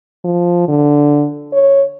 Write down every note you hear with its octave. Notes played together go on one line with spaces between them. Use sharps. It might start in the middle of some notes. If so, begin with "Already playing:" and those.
F3
D3
C#5